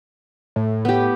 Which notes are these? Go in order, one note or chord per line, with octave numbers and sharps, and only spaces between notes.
A2
B3 G4